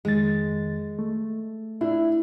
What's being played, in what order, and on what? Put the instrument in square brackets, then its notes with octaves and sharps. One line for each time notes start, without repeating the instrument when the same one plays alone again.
[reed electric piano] F2 D#3 A6 [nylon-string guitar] G#3
[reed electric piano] A3
[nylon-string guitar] D4 [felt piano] E4